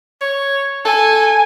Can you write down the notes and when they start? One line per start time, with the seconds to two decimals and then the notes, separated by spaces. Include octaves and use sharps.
0.22 C#5
0.85 A4 G#5